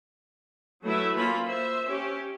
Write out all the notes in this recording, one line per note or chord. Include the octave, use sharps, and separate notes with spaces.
F#3 A3 E4 B4 E5
A#3 C#4 F4 B5
C5 E5
C#4 G4